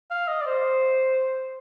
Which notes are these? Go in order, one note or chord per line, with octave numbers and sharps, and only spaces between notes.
F5
D#5
D5
C5